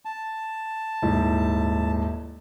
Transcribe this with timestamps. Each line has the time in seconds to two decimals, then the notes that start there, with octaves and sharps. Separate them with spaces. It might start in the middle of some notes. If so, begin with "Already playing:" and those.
0.05 A5
1.02 D#1 G#2 E4